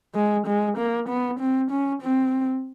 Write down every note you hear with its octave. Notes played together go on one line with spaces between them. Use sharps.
G#3
G#3
A#3
B3
C4
C#4
C4